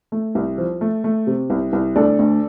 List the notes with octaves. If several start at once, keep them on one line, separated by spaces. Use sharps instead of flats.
A3
C2
F3
A3
A3
C3
C2
C2
D2 A4 D5
D2